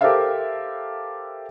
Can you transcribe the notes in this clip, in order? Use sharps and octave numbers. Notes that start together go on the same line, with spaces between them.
G4 A4 A#4 C5 E5 F5